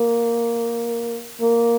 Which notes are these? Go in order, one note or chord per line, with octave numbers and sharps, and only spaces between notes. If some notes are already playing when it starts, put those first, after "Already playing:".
Already playing: A#3
A#3